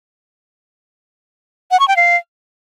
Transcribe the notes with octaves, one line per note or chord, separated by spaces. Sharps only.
F#5
C#6
G5
F5